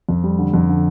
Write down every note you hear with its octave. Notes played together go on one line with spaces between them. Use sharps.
F2
G3
D3
F2
D3